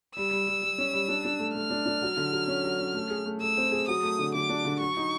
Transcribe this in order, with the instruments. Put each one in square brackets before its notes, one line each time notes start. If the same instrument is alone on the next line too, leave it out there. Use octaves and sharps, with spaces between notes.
[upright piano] G3 [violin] E6
[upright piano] G3
G3
G3
C#4
G3
D4
D4
A3
[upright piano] A3 [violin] F6
[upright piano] D4
D4
F#3
D3
F#3
C#4
F#3
C#4
A3
G#4
A3
[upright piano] A3 [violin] E6
[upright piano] C4
G#4
[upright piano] F#3 [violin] D#6
[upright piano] A3
D3
[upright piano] D3 [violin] D6
[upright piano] D4
D3
[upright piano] F#3 [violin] C#6
[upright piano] D#4